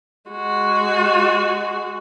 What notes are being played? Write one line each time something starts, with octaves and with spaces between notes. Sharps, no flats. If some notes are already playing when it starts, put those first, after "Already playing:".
G#3 F#4